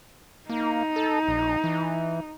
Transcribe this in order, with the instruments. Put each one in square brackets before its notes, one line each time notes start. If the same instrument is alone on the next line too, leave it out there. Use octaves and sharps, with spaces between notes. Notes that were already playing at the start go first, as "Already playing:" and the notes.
[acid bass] A#3 [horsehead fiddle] D#4
[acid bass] A4
A#1
E3